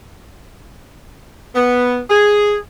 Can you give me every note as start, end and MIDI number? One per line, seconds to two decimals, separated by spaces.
1.55 1.98 59
2.09 2.55 68